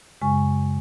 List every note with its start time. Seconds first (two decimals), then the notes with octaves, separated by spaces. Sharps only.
0.22 F#2 C#3 G#3 G#5 C#6